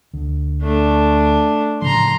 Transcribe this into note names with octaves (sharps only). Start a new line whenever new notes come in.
D2
A3 D4
A2 C#3 F3 A#5 C6